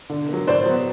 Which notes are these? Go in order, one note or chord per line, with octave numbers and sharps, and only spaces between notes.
D3
F#3 A#3
A2 C5 D5
F#3 B3